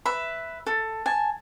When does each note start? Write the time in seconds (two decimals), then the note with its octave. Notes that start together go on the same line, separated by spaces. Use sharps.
0.06 B4 E5 B5
0.66 A4
1.06 G#5 A5